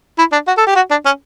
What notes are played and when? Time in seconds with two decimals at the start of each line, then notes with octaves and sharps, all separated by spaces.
0.19 E4
0.32 D4
0.47 F#4
0.57 A4
0.67 G4
0.75 F#4
0.91 D4
1.06 C#4